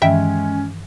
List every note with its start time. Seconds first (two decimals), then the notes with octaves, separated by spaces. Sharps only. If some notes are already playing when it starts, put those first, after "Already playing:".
0.02 G2 D#3 E3 G#3 C#4 E5 G5